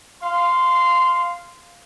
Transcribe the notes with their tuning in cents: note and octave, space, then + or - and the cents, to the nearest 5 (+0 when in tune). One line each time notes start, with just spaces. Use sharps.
F5 +0 C6 -15